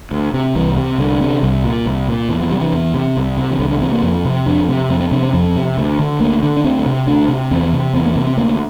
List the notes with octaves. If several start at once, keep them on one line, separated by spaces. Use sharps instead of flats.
D2
C3
C2 E3
C3
C2 D3
C3
C2
A#2
C2
A#2
E2 E3
F3
C3 G3
E3
E2
C3
C2
C3
E3
C2 D3
D3
C3 E3
A#3
F2
C3
F2 D4
C3
F2 C4
C4
C3 D4
C4
F2 C4
C3
D2
D3
D2 A#3
D3
D4
D2 C4
C3
D2 D4
C3
E2 C4
C3
E2 C4
A#3
C3 A#3
C4
D2 A#3